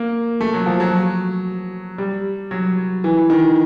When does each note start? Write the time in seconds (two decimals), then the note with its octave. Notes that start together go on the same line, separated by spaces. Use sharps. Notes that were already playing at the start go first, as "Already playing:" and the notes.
Already playing: A#3
0.41 A3
0.54 F#3
0.66 F3
0.80 F#3
1.98 G3
2.51 F#3
3.04 E3
3.30 D#3